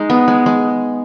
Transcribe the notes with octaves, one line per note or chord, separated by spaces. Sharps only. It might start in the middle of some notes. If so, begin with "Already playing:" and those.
Already playing: G#3 D#4
B3
G#3
G#3